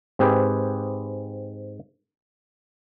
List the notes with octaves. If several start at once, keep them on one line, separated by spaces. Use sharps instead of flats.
G#2 C4 G4 G#4 B4